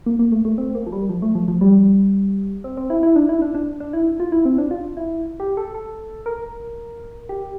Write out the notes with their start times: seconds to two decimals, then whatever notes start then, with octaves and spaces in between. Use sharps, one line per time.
0.06 A#3
0.19 A#3
0.32 A3
0.45 A3
0.58 C4
0.75 A#3
0.87 F3
0.92 G3
1.09 F3
1.22 A3
1.35 F3
1.48 F3
1.61 G3
2.64 C4
2.77 C4
2.90 E4
3.03 E4
3.16 D4
3.29 E4
3.42 D4
3.55 D4
3.80 D4
3.93 E4
4.20 F4
4.32 E4
4.45 C4
4.58 D4
4.71 F4
4.97 E4
5.40 G4
5.57 A4
5.74 A4
6.26 A#4
7.29 G4